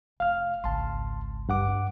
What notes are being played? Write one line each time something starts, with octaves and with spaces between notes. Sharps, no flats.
F1 F5 F6
G#1 C#2 A5 C6
G2 F#5 D6